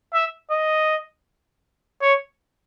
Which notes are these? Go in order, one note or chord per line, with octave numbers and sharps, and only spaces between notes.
E5
D#5
C#5